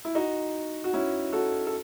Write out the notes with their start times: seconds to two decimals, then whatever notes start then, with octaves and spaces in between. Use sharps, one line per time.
0.05 E4
0.15 D#4 F#4
0.84 F#4
0.93 C#4 E4
1.33 F#4 A4
1.67 A4